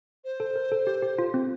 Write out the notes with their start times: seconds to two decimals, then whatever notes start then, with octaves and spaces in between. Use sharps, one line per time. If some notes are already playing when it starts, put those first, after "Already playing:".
0.24 C5
0.40 A4
0.56 A#4
0.72 A4
0.87 G4
1.02 G4
1.19 F4
1.34 C4